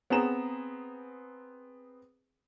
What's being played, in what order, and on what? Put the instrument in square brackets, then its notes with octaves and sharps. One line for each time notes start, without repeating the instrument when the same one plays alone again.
[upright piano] B3 C4 G#4 A#5 E7